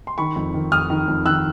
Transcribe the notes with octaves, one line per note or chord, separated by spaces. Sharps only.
C6
D#3 B5 C#6
F2
D#3
F2 D#6 F6
D#3
F2
D#3 E6 F#6